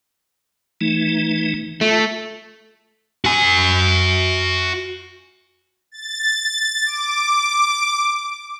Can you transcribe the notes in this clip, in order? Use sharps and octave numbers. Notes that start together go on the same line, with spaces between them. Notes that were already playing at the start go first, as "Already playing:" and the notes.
E3 A3 D#4
A3 F4
F#4 G#5
A6
D6